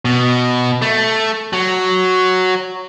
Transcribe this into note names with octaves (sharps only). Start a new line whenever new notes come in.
B2
A3
F#3